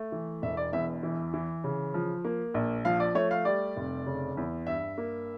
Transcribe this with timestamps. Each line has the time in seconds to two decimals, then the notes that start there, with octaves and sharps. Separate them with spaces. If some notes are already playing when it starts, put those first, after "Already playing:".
Already playing: A3
0.12 E3
0.42 E1 E5
0.57 D5
0.73 E2 E5
1.03 E3
1.34 E3
1.64 C#3
1.94 F3
2.25 A#3
2.54 A#1
2.85 F3 F5
3.00 D5
3.15 A3 C#5
3.31 F5
3.45 G3 D5
3.77 F1
4.06 C#3
4.37 E2
4.67 G2 E5
4.98 A#3